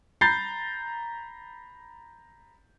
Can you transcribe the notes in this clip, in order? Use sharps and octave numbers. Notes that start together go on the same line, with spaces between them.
A#5 B5 G6 A6 C7